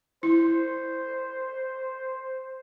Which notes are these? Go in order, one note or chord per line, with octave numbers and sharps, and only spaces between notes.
E4 C5